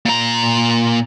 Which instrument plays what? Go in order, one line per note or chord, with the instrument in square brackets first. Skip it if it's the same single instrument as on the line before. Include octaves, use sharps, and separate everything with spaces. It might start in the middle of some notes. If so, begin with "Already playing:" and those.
[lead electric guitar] A#2 A#5